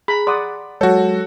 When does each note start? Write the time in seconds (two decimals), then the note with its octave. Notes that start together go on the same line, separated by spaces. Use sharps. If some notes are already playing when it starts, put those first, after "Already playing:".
0.08 G#4 A#5 B5
0.27 D5 F#5 C6 D#6
0.81 F#3 G#3 F#4 A4 C#5